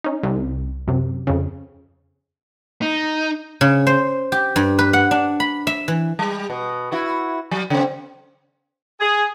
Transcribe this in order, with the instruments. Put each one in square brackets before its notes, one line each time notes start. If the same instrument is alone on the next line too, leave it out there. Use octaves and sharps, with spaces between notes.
[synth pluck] C#4 D#4
C2
F#2 C3
F2 C#3
[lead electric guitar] D#4
[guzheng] C#3
C5
G4
G2
B4
F#5
D4
B5
E5
E3
[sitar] G3
B2
E4 F#4
F#3
C#3 C4
[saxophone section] G#4